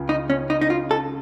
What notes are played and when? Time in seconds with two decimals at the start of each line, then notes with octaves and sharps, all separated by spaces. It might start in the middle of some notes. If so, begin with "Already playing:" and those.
Already playing: C#2 C#3
0.09 D#4
0.30 C#4
0.50 D#4
0.61 D#4
0.70 F4
0.91 A4